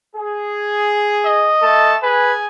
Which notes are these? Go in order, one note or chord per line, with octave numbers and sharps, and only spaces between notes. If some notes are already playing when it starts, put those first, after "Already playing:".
G#4
D#5
A3 A4 A5
G#4 B4 G#5